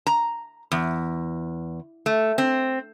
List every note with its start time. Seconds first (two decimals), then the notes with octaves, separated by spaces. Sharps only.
0.07 A#5
0.72 E2
2.06 A3
2.38 C4